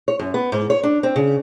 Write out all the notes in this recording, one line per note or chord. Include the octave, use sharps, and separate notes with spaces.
C#5
F#2
B3
G#2
C#5
D4
C4
C#3